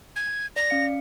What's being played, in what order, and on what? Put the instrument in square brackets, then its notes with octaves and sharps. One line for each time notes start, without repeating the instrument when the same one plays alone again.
[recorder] G#6
[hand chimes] D5 [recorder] A#6
[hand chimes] C#4 F5 C#7